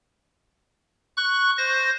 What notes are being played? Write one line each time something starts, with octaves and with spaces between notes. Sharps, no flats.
C#6 F#6
C5 A#6